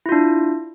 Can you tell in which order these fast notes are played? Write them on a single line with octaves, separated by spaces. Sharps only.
E4 F4 D4